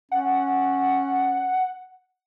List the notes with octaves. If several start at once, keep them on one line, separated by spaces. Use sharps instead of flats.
C#4 F#5